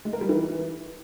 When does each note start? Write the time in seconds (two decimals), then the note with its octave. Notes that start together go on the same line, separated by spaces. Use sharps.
0.05 G#3
0.13 A#4
0.21 G3
0.29 E3